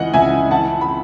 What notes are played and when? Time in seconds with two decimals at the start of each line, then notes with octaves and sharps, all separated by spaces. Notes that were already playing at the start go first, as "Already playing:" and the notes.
Already playing: C#2 C#3 E3 D#5 F#5
0.13 C#2 E5 G#5
0.51 E3 F#5 A5
0.81 B5